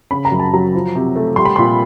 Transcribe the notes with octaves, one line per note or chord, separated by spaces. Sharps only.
C#3 B5
A#5
F#2
A5
F#3 A#5
F3
C3
A3
G3 C6
B5
A#2 C6